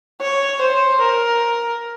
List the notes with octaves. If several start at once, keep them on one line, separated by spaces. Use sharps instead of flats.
C#5
C5
A#4